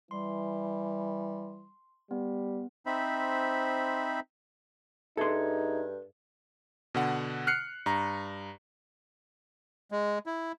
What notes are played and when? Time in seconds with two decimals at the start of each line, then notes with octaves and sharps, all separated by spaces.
0.11 E3 G3 C6
2.11 G3 B3
2.86 C4 D#4 C5 E5 B5
5.17 G2 D#4 G#4 A4 E5 C6 G#6
6.94 B2 D3 F#5
7.47 F6 F#6 C7 C#7
7.86 G2 A#5
9.91 G#3
10.26 E4